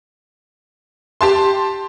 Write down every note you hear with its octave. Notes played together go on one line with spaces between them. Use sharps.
G4 A5 C6